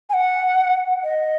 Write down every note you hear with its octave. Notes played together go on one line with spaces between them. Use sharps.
G#5
F#5
D#5